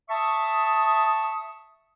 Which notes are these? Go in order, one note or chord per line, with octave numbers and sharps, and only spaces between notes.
E5 A5 C#6 D#6